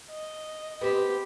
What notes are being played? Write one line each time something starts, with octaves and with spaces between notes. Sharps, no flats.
D#5
B3 C4 G4